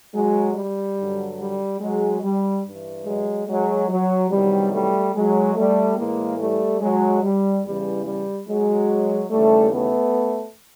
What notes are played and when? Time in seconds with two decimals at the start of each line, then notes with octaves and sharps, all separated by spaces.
0.13 F#3 G#3
0.55 G3
0.97 G2 D3 F#3
1.39 G3
1.80 F#3 G#3
2.22 G3
2.64 G2 E3
3.05 F#3 G#3
3.47 F#3 G#3
3.88 F#3
4.30 E2 C3 D#3 F#3 G3
4.72 G3 A3
5.14 F#3 G#3
5.55 G3 A3
5.97 A2 E3 G#3 A#3
6.39 G3 A3
6.81 F#3 G#3
7.23 G3
7.64 E2 C#3 E3 G3
8.05 G3
8.47 F#3 G#3
9.30 D#2 C#3 E3 G3 A3
9.72 A3 B3